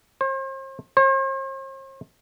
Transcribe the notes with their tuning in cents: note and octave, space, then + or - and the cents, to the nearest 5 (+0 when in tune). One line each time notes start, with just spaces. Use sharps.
C5 +40
C5 +45